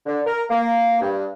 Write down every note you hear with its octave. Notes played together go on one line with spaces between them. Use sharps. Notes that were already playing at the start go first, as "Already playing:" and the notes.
D3
A#4
A#3
G2